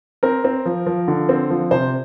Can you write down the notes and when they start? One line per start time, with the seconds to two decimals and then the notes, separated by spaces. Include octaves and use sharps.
0.23 C4 A#4
0.44 C4
0.66 F3
0.86 F3
1.08 D3
1.29 C4
1.50 F3
1.71 C3 C5